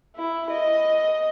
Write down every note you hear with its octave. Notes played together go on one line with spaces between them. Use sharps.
E4
D#5